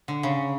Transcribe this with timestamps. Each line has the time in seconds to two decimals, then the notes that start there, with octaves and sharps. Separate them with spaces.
0.08 D3
0.23 C#3